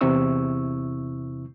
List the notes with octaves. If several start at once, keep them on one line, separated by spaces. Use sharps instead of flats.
E2 C3 C4 E4 C#6 E6